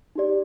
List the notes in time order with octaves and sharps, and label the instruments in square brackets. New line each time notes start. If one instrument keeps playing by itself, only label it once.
[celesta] D#4 G4 D5